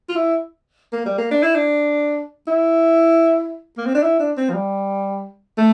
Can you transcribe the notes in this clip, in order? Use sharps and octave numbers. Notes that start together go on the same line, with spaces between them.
F4
E4
A#3
G3
A#3
D4
E4
D4
E4
A#3
C4
D4
E4
D4
C4
F3
G3
A3